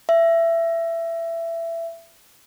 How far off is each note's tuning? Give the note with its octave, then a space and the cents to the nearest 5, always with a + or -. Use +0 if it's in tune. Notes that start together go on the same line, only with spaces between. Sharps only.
E5 +20